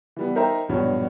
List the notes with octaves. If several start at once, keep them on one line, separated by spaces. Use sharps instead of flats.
E3 G3 B3
D#4 A#4 C5 E5 G5 A#5
E1 A#1 G2 B2 C#5